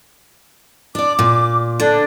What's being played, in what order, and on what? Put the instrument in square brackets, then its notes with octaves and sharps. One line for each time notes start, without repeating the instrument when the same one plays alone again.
[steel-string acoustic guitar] D4 D5 [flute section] D6
[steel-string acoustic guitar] A#2
[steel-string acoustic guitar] D3 [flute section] D4